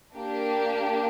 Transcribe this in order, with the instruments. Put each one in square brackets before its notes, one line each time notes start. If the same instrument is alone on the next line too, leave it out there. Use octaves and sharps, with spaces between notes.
[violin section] A#3 D4 G4